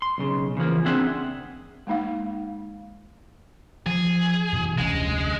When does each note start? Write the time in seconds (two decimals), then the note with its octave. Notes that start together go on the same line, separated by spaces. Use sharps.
0.02 C6
0.18 B1 C#3
0.57 C#3 E3 F3 A#3
0.85 C4 D4 G#4 E5 F#5 C6
1.87 G#3 A#3 D#4 F5
3.86 F3 G#4
4.52 F#2 B2 E3
4.78 F1 D2 G#3 C#4